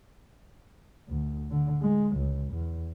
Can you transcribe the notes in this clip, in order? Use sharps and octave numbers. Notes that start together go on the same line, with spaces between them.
D2
D3
G#3
C#2
E2